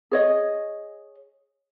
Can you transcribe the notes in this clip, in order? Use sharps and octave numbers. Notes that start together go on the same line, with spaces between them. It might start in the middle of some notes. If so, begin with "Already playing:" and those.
G#4 C#5 D#5